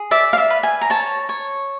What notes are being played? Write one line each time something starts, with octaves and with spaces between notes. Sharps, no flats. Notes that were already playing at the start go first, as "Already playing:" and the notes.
Already playing: G#4
D5 E5
F5
E5
B4
G#5
A#5
C#5 A5
C#5